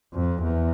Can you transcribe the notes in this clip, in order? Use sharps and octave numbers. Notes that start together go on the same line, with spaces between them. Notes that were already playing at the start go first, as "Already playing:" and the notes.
F2
E2